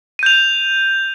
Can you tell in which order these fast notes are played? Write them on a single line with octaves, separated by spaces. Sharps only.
D#7 G6 F7